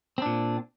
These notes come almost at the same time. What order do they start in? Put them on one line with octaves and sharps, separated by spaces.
C4 D4 A#2